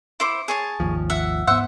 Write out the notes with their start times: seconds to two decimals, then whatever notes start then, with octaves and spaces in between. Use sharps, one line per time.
0.20 E4 C5 D6
0.48 G#4 C#5 A5
0.80 G#1 D#2 F3
1.10 E5 F#5
1.47 G#2 B3 C5 E5 F#5